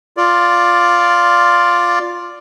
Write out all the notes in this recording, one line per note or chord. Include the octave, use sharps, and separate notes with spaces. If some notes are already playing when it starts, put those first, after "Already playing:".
F4 D5